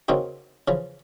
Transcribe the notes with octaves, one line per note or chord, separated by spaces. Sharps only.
C#3 A#3 C4 D#4 F#4
C#3 E3 F3